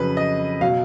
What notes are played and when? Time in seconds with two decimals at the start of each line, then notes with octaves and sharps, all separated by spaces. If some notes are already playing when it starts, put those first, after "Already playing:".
Already playing: F2 C#3 F#3 B4
0.17 D#5
0.61 B2 F#3 F5